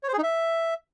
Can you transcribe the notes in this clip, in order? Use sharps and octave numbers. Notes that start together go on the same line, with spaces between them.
C#5
C5
G#4
D#4
E5